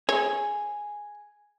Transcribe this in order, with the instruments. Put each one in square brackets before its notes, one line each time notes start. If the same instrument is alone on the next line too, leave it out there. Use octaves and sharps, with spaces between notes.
[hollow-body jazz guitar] G#4 [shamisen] C#5